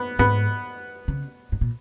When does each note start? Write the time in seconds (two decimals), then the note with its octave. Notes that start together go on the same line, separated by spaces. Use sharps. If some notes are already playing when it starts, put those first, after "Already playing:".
Already playing: B3
0.19 G#2 B3
1.08 C#3
1.52 G#2
1.61 A#2